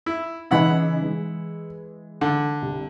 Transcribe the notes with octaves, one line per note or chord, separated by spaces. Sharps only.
E4
C#3 E3 D#4 E4 F#5 B5
E3 G#3
D3
C2